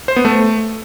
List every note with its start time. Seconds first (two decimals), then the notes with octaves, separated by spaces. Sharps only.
0.08 C5
0.16 B3
0.25 A3